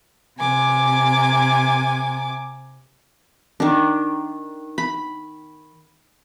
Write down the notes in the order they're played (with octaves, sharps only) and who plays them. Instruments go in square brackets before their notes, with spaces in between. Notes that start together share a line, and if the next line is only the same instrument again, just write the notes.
[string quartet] C3 G#5 D6
[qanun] D#3 D4
B5